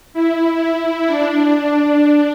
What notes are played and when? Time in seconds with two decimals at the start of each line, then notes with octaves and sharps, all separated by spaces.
0.14 E4
1.07 D4